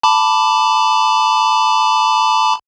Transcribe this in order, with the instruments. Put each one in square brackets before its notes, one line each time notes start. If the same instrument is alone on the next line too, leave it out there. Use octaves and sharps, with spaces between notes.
[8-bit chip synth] A5 B5 D6